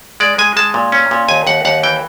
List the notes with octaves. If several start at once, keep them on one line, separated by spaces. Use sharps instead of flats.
G#3 D5
G#3 G#5
G#3 A5
A#2
C#4
A#2
D#2 G#5
D#2 F#5
D#2 F#5
E3 G5